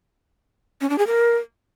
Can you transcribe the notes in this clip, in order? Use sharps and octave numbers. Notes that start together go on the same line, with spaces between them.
C#4
D4
G#4
A#4